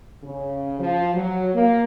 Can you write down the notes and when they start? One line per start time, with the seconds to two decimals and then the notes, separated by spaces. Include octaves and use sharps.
0.22 C#3
0.79 F3
1.14 F#3
1.54 A#3